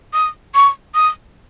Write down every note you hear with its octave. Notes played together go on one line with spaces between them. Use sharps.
D#6
C#6
D#6